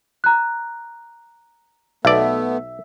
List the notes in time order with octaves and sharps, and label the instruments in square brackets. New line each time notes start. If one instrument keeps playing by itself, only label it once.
[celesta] A#5 F#6
[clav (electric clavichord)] B1 D5 [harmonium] A3 B3 [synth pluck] E5